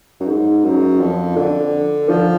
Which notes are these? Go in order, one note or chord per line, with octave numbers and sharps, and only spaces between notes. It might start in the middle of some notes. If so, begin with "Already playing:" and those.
F#2
G#2
F#2
F2
D3
F3